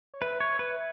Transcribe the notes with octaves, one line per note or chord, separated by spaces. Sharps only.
C#5
B4 E5
C#5
B4